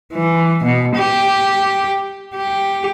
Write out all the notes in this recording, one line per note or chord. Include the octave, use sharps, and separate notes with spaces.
E3
B2
G4
G4